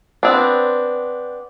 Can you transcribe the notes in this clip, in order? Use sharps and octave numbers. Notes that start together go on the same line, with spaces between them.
B3 C4 D4